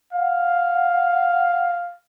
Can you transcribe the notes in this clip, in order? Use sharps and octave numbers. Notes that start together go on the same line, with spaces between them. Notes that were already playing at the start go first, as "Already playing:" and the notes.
F5 F#5